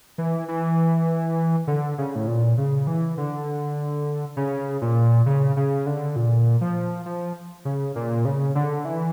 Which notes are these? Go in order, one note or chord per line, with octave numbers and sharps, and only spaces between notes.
E3
E3
D3
C#3
A2
A#2
C#3
E3
D3
C#3
A#2
C#3
C#3
D3
A#2
F3
F3
C#3
A#2
C#3
D3
E3